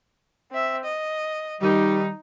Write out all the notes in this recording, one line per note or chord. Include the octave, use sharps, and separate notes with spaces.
C4 E5
D#5
D#3 G3 D#4